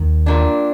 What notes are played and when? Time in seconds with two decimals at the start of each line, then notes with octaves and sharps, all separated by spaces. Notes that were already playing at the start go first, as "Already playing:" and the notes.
Already playing: D#2 D#3
0.26 A#2 G3 A#3 D4